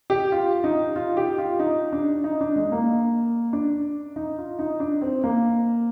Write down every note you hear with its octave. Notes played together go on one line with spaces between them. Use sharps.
G4
F4
D#4
F4
G4
F4
D#4
D4
D#4
D4
G#3
A#3
D4
D#4
F4
D#4
D4
C4
A#3